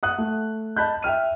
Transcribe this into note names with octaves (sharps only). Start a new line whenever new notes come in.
F#5 D#6 F#6
A3
D#5 A5 B5 F#6 G6
E5 G5 F6 D#7